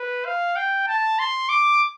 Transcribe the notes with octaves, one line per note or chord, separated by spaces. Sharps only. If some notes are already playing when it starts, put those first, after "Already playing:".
Already playing: B4
F5
G5
A5
C6
D6